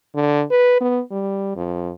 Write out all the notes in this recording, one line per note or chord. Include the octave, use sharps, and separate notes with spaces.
D3
B4
B3
G3
F2